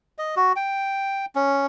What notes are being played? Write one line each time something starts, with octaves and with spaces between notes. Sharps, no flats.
D#5
F#4
G5
C#4